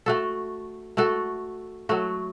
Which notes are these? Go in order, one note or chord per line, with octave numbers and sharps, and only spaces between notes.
A3 F#4 A4
A3 F#4 A4
F#3 A3 F#4